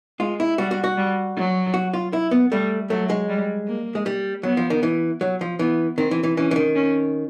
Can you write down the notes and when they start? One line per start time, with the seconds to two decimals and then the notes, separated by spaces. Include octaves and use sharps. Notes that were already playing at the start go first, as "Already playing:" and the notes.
0.19 G#3 F4
0.40 E4
0.58 G3 F#4
0.71 F#4
0.84 F#4
0.97 G3
1.36 F#3
1.74 F#4
1.94 F4
2.13 E4
2.31 B3
2.52 G3 A3
2.90 F#3 A3
3.10 G#3
3.29 G3
3.67 A#3
3.95 G#3
4.06 G3
4.43 F#3 B3
4.57 F3
4.70 D#3
4.83 E3
5.21 F#3
5.41 F3
5.59 E3 B3
5.98 D#3 C4
6.11 E3
6.23 E3
6.37 E3 C#4
6.51 E3
6.56 D#3
6.75 C#4